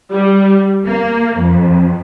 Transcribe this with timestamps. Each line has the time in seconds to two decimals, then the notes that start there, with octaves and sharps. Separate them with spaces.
0.10 G3
0.85 A#3
1.38 F2